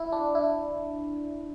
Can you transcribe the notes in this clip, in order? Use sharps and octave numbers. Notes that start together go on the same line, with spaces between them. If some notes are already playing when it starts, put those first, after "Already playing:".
Already playing: E4
D4
E4